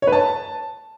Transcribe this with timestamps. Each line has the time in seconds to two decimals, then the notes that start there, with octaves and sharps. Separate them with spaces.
0.02 C#5
0.07 B4
0.12 A5